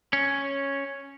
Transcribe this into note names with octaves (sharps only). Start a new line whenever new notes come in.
C#4